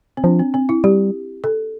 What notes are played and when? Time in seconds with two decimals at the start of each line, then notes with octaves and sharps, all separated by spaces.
0.17 C4
0.24 F3 D4
0.39 C4
0.54 C4
0.69 E4
0.84 G3 G4
1.44 A4